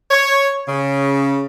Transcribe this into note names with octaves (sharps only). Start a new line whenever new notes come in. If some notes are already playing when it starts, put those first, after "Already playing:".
C#5
C#3